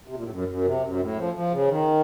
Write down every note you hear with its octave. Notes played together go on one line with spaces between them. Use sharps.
C3
A#2
A2
F#2
F#2
C3
F#2
A2
F3
F3
C#3
D#3